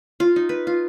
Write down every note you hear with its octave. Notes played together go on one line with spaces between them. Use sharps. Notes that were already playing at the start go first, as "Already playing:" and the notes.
F4
D#4
B4
F4